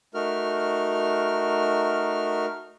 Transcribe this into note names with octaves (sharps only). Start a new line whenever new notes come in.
A3 D#4 F#4 A#4 F6